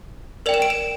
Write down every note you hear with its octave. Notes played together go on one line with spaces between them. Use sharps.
A#4 D5 G5 F7
E7
D7
E7